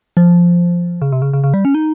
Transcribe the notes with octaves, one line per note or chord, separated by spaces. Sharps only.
F3
C#3
C3
C#3
C#3
C#3
G3
C#4
D#4